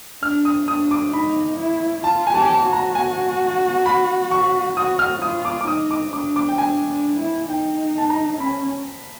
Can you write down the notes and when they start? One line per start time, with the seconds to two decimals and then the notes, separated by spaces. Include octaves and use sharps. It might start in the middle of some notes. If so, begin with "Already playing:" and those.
0.22 D4 F6
0.45 D#6
0.68 D4 D#6
0.91 D6
1.13 D#4 B5
1.58 E4
2.04 F4 A5
2.27 G#5
2.34 G4 A5
2.42 G#5
2.50 A5
2.65 F#4
2.73 A#5
2.95 G#5
3.86 B5
4.31 C#6
4.76 F#4 D#6
4.99 F6
5.21 F4 D#6
5.45 D6
5.61 D6
5.67 D#4 D#6
5.91 D6
6.13 D4 D6
6.36 D6
6.49 G5
6.58 D4 G#5
6.88 D4
7.19 E4
7.49 D#4 G5
7.98 A5
8.10 A#5
8.39 C#4 B5